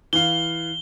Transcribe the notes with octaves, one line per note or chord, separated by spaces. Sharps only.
E3 F5 G7